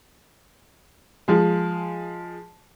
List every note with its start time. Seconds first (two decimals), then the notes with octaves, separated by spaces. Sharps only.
1.28 F3 G#3